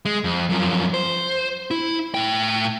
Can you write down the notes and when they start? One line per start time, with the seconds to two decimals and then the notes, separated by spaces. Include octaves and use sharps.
0.05 G#3
0.24 F2
0.50 F#2 F3
0.94 C5
1.71 E4
2.14 A2 G5